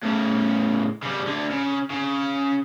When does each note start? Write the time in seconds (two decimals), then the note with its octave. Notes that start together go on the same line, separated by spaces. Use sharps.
0.03 A2 C#3
1.02 C#3 G3
1.27 D2 D3
1.50 C#3
1.91 C#3